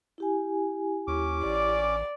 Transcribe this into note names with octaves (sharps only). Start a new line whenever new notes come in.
E4 G4 G#5
D#2 C#4 D6
A1 D5